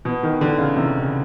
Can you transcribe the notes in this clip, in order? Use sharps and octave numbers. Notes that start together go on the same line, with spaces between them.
B2
D#3
D3
C#3
C3
C#3